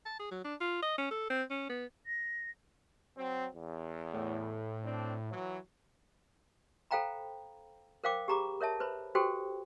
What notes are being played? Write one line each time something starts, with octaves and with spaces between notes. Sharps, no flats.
A5
G#4
F#3
D4
F4
D#5
C#4
A4
C4
C#4
B3
A#6
F#3 C4
E2
A2
C4 D4
E3 F#3
A4 C5 F5 G5 A#5 B5
A#4 C5 F5 G5 D6
G4 G#4 A#5 B5 D6
A#4 C#5 E5 A5
B4 C5 B5
F#4 G4 A4 B4 C5 G5